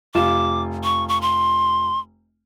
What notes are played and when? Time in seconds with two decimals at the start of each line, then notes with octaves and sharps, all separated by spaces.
0.15 F1 F4 D6 E7
0.84 C#6
1.08 C#6
1.21 C6